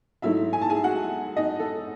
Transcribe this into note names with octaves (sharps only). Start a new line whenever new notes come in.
G#2 F#3 A3 D#4 E4 E5
G#5
A5
G#4 G#5
F#4 F#5
D#4 D#5
A4